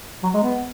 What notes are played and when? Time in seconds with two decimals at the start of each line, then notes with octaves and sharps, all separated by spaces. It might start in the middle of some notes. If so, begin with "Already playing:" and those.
0.23 F#3
0.34 G#3
0.43 B3